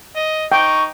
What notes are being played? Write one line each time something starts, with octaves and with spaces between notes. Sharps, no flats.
D#5
D#4 G5 C#6